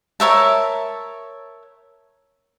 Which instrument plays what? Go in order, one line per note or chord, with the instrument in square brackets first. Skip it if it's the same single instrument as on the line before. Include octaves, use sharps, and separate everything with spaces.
[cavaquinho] A#4 C#5 E5 A5